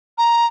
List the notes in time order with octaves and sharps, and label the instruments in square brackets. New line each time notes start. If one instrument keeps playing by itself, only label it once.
[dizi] A#5